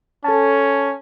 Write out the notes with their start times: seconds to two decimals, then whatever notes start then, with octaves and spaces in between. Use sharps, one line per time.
0.24 C#4 A4 A5